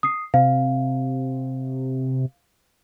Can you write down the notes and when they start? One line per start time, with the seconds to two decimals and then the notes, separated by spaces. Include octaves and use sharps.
0.03 D#6 C7
0.34 C3 F5